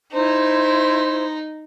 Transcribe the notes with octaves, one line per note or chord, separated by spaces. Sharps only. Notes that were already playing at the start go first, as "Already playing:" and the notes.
D#4 E4 C5 C6